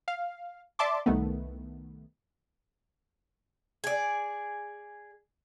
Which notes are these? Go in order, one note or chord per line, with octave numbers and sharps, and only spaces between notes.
F5
D5 E5 A5 C6 D6
C2 D#3 A3 B3
G#4 D5